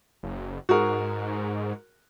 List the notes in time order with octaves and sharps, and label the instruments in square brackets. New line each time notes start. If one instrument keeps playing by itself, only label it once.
[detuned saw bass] F#1
[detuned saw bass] G#2 [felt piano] F#4 G#4 A#4